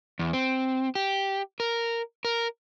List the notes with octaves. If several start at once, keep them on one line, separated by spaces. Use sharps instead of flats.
E2
C4
G4
A#4
A#4